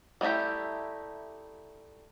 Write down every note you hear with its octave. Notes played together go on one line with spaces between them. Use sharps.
G3 A3 D#4 E4 G4